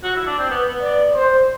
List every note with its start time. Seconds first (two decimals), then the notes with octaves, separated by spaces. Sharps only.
0.03 F#4
0.16 E4
0.26 D4
0.38 C4
0.50 B3
0.67 B3
0.82 D5
1.15 C5